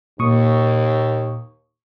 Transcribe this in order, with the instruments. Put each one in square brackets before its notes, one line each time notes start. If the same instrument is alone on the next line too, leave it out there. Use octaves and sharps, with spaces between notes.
[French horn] D#2 [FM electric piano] A#2 C#6 D#6